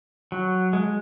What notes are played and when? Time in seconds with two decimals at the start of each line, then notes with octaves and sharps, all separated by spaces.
0.32 F#3
0.73 G#3